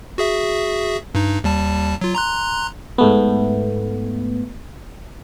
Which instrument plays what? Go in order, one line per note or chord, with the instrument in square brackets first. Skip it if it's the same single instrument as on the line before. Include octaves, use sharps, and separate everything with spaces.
[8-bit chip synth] F#4 G#4 E5
G2 D#4
D#2 G3 A5
F#3 F4
A#5 C6 F#6
[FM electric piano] G#2 A3 B3